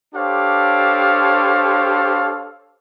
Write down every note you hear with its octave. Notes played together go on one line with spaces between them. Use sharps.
D4 G4 A4 C5 C#5 F5